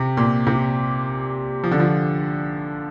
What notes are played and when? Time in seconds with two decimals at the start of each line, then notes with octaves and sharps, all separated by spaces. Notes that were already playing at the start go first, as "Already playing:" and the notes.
Already playing: C3
0.17 A#2
0.47 C3
1.64 F3
1.71 D3
1.80 F3